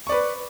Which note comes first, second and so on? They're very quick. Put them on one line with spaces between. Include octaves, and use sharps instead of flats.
C#6 D5 B4